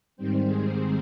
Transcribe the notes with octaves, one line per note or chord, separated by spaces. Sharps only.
G#2 D#3 G3 C4 C5
G#3 G#4